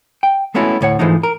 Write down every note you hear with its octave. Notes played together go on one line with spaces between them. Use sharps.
G5
G#3 A3 B3 C#4 E4 F#4
D2 A2 C#5 F#5
G#2 E3 F3 G#3 A3 D#4
A#4